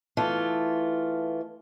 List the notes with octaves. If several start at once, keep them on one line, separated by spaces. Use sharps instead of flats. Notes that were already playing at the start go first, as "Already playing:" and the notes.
E3 A3 F4